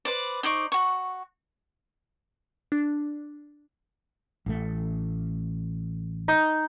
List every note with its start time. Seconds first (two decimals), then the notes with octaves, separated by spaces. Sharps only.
0.05 B4 C5 D5
0.43 D#4 C5 D5 C#6
0.72 F#4 C#6
2.72 D4
4.46 A1 A3
6.28 D#4